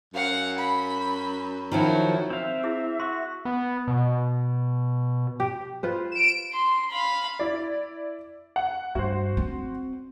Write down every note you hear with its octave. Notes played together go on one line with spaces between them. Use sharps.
F#2 F5 F#5
B5
D#3 F3 F#3 E4 F#4
C4 E5 F5
E4 G#4
F#4 C6
B3
B2
G4
F4 B4 C5
D7 E7
C6
F5 B5
E4 D5
F#5
G2 F#4 C5
C4